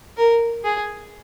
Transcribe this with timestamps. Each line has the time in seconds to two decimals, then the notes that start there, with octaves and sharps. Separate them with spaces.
0.17 A#4
0.64 G#4